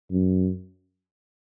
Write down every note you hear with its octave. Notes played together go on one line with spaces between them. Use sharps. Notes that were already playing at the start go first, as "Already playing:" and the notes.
F#2